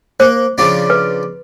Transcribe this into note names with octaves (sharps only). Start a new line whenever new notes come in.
A#3 C5
C#3 F3 D4
B4